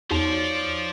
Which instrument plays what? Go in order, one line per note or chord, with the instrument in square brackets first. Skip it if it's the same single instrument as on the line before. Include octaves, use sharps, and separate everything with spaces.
[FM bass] E2 [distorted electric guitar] F3 [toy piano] D#4 F#4 [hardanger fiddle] C#5 D5